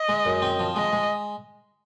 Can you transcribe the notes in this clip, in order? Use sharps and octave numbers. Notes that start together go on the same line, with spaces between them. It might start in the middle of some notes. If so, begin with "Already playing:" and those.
Already playing: D#5
G#3
F#2
C4
F3
G#3 D#5
G#3